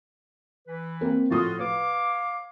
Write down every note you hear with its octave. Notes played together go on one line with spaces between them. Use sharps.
E3 B4
A#3 C4 A#4
A2 F3 F4 F#4 D#6
B4 C#5 F5 D6